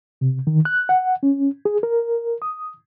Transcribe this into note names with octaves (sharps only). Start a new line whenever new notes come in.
C3
D#3
F#6
F#5
C#4
G#4
A#4
D#6